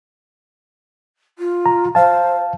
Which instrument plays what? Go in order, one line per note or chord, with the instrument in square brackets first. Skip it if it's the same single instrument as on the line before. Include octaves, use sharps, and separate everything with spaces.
[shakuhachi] F4
[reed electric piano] A#5
[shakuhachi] C5 [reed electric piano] F5 A5